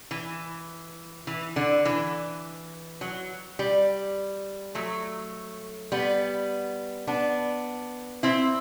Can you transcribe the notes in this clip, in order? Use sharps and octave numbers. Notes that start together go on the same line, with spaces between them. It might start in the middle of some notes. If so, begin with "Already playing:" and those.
E3
E3
D3
E3
F#3
G3
F#3 A3
G3 B3
B3 D4
C4 E4